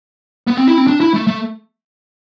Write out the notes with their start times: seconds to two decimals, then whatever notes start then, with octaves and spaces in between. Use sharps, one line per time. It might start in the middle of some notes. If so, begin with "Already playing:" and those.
0.47 B3
0.57 C4
0.67 E4
0.78 C4
0.87 D4
1.00 E4
1.14 A3
1.27 A3